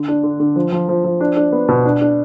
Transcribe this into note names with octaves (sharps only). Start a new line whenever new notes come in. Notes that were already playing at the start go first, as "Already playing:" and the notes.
Already playing: D3
D4
D3
D3
F3
F3
F3
F3
D4
D4
B3
B2
D4
D4